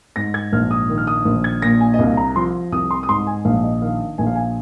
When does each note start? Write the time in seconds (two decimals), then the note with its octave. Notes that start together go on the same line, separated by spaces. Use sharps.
0.16 G#2 A#6
0.34 G#6
0.53 A#1 F6
0.71 D#6
0.89 D#3
0.98 F6
1.07 D#6
1.25 A#1
1.44 G#6
1.62 A#2 A#6
1.80 G#5
1.94 D#5
1.99 C2 F5
2.17 A#5
2.36 F3 C6
2.72 C2 D#6
2.91 C6
3.03 D#6
3.09 G#2 C6
3.27 G#5
3.45 A#1 F5
3.64 D#5
3.82 D#3 F5
4.18 A#1 G#5
4.27 F5
4.36 G#5